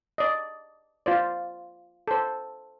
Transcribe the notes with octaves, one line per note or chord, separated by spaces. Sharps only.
D5 D#5
F4 C5 D5
A4 C5